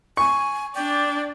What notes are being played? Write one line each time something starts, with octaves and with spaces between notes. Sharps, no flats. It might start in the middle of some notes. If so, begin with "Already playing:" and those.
G#5 C#6
D4 D5 G5